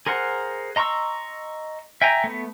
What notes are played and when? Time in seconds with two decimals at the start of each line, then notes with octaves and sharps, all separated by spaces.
0.07 G#4 A#4 C5 F#5
0.76 D#5 A#5 C6 C#6 E6
2.02 E5 G5 G#5 A#5
2.24 A3 B3